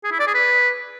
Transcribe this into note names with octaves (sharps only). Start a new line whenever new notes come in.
G#4
E4
D5
G#4
B4